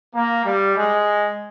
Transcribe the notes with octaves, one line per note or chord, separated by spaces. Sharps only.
A#3
G3
G#3